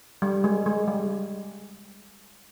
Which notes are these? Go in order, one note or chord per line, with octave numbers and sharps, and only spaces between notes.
G3
G#3
G#3
G3